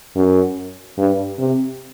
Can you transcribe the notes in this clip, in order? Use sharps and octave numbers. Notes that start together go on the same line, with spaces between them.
F#2
G2
C3